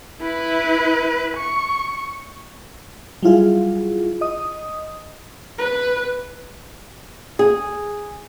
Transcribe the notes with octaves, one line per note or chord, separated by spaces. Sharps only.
E4 B4
C#6
F#3 G3 E4 F4 G#4
D#5 D#6
B4
G#4